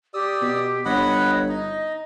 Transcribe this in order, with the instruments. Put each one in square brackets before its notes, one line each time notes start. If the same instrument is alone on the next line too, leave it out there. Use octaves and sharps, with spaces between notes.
[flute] G4 [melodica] D5 D#6 E6
[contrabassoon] B2
[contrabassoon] G1 [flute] C#5 [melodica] D#5 F#5 B5
[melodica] D#4 [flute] D#5